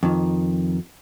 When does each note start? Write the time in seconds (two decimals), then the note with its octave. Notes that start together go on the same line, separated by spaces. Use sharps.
0.03 F2 D#3